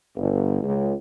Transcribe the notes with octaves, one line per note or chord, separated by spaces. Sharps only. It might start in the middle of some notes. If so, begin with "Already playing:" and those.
G1
C#2